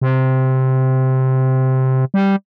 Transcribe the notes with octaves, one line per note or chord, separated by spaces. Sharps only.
C3
G3